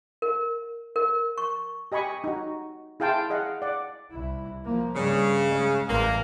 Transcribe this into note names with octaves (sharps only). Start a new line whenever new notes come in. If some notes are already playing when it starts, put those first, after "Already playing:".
A#4
A#4
C#6
G4 D#5 G#5 B5 C#6 D#6
D#4 F#4
E4 G#4 F5 G5 A5 C6
G#4 D#5 F5 F#5
D5 F#5
C2 E4
F3 A#3
G2 C#3 G3
G#3
A1 E2 A#3